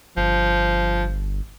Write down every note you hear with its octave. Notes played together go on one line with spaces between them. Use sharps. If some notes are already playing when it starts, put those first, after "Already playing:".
G1 F3